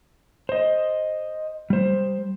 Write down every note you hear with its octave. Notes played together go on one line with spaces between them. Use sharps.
C5 D#5
G3 C5